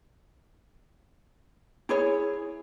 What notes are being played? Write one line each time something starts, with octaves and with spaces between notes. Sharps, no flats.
E4 G#4 C#5